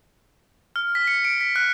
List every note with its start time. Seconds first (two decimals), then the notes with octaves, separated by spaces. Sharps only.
0.76 F6
0.95 B6
1.07 C#7
1.25 D7
1.41 B6
1.56 F#6